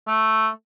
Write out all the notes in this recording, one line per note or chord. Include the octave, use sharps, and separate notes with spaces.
A3